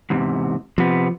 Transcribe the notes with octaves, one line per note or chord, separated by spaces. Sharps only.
E2 G#2 C3
C3 F3 B3